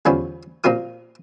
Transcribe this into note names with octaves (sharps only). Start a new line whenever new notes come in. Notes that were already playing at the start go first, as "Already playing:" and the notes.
E2 D3 F3 G3 B3 C#4
A#2 F3 C4 F4 A#4 D#6